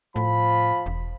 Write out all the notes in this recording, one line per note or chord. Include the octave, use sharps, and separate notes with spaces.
A2 F3 B5
E1